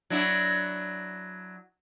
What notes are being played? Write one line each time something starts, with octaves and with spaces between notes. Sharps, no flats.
F#3 D4 E4